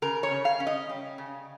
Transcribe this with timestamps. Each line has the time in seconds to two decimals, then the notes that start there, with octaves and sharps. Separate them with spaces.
0.02 C#3 A#4
0.23 C#5
0.31 C#3
0.45 F5
0.60 C#4
0.67 D#5
0.89 G3
1.18 C#3